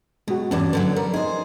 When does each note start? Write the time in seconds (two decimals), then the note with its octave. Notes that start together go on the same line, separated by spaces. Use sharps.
0.28 B2 G#3 F#4
0.51 E2 G2 E3 C#4 B4 D5
0.73 D3 F3 F#3 B4 F#5
0.96 G3 A#4
1.14 D#4 G#4 C5